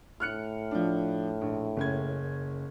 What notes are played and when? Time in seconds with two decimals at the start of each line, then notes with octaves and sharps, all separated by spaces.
0.20 A2 F6 F#6 C#7
0.71 F3 D4
1.42 A#1
1.77 F#1 C#4 G#6